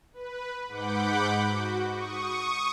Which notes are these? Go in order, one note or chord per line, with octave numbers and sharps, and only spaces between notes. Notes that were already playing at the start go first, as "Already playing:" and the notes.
B4
G#2 F#5 B5 D6 G6
F#4
C#6 D#6